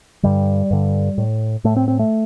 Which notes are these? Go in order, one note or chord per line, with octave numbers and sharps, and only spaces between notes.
G2 D3 G3
G2 D3
A2
A2 A3
C4
C4
A3